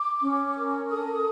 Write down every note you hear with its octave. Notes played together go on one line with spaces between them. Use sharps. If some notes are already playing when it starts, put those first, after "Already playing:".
Already playing: D6
C#4
A#4
A4 D#6